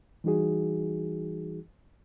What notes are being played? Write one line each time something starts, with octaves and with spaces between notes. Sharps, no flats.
E3 G3 D#4 F#4 G#4